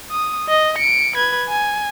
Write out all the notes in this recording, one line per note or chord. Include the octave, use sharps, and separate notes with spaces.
D#6
D#5
C#7 D7
B4 G#6
G#5